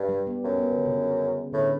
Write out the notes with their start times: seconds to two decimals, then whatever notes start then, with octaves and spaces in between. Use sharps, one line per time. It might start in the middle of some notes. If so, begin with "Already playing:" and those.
Already playing: G2
0.09 G3
0.27 B3
0.44 F#2 C#4
0.58 B3
0.72 D3
0.86 C#3
1.53 A2 D3